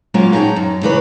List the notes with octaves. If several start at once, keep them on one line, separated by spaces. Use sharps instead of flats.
F#3 G#3 A#3 C#4 F4 A#4
D4 D#4 G#4 B4 C#5 G5
F#2
C#3 E3 D4 A#4 B4 C#5